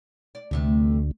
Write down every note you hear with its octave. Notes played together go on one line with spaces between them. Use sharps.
D5
D2 G2 C3 A3